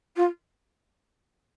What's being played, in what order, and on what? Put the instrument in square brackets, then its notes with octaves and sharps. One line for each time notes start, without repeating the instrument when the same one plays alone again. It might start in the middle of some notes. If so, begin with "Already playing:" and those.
[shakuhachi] F4